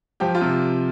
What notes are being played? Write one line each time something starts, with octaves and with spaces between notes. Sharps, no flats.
F3 G4
F4
C3